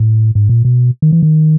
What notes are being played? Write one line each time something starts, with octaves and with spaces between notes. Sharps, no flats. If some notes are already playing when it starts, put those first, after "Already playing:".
Already playing: A2
G#2
A#2
B2
D#3
E3
D#3